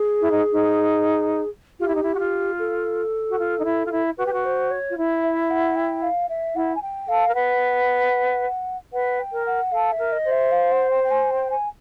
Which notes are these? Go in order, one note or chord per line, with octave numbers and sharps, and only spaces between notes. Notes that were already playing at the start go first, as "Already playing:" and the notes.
Already playing: G#4
E4
D#4
D#4
F4 G4
E4
D#4
E4
F#4
F4
A4
F#4
F4
D#4
E4
F4
E4
F#4 B4
G4
F#4
C5
C#5
F4
E4
E5
F#5
G5
F5
E5
E4 F#5
G#5
G5
A4 F5
A#4
B4 F#5
B4 F#5
G5
A#4
F#5
A4 F5
E5
A#4
D#5
C5
E5
F5
F#5
G5
G5
G#5
G5
G#5